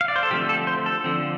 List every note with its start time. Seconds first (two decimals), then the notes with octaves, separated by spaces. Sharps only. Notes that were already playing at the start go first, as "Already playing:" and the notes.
0.01 F5
0.08 D5
0.16 C5
0.23 A4
0.30 D3 F3 A3 C4 G4
0.49 A4
0.67 C5
0.86 A4
1.04 D3 F3 C4